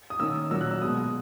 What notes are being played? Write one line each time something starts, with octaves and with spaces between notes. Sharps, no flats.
D#6
D#3 A#3 C#4 E6
A#2 F#3 A#3 E6
F#6
E6
B2 G#3 B3 D#6